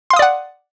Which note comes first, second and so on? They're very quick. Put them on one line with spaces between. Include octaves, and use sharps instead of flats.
C6 F5 D#6 D5 F#5